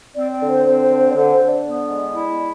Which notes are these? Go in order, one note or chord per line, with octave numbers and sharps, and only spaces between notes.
C4 D5
D5
D3
C5
C4 C5
C5
D3
C5
D5
D3 C5
C5
D3
D5
B3
G#3
E4